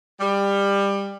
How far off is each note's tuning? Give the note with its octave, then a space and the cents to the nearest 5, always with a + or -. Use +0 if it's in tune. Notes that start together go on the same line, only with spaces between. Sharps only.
G3 +20